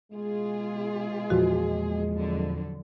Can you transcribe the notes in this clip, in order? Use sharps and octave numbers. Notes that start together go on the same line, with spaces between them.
B2 G#3 F4 G#4
E2 A#2 F3 F#4
F2 D3 F#3